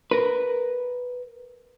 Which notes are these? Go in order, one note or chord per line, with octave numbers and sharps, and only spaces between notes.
A#4 B4